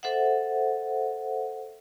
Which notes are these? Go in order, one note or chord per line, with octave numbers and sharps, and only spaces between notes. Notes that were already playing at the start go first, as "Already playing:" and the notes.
A4 C5 E5 F#5